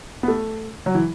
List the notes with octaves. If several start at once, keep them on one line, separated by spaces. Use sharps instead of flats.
B3
A3
F#3
E3